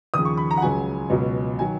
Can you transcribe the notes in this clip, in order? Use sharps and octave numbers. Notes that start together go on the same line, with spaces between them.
D#2 C#3 F3 D#6
C#6
B5
A#5
F#5
C#2 C#3 F#3 G#5
C#2 B2 F#3
D#3 F#3 G#5